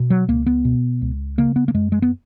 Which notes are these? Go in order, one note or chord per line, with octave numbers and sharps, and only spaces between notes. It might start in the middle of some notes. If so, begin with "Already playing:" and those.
Already playing: B2
F#3
C#2 A#3
B3
B2
C#2
C#3 A#3
B3
A#3
F#2 G#3
G#3
B3